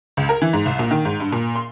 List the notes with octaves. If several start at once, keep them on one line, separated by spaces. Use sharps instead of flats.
C#2
A#4
E3
G#2
C2
A#2
D#3
G#2
G2
A#2
C6